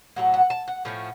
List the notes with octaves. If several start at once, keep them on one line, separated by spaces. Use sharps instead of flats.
A2 F#3 A3 F#5
F#5
A5
F#5
A2 F3 A3 C#4